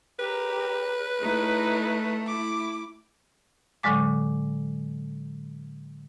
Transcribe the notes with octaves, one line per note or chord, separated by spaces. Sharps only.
G4 A#4 B4
A3 D#4 E4
E4 D6
A2 D3 F#3 G#3 D6